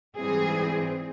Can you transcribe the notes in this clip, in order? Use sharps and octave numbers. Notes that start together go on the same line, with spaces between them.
G#2 E3 G3 C4 G#4